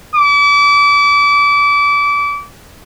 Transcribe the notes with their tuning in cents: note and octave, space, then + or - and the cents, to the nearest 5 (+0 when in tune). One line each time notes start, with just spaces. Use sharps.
D6 -30